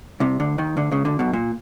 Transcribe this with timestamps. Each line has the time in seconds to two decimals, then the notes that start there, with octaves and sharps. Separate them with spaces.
0.20 C2 C3
0.40 D2 D3
0.58 D#2 D#3
0.77 D2 D3
0.91 C#2 C#3
1.05 D2 D3
1.19 B1 B2
1.33 A#2